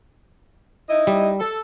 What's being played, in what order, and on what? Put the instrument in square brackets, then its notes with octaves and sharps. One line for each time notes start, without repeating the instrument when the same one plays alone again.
[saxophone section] D#4 E4 D#5
[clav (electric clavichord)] G3
[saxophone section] A4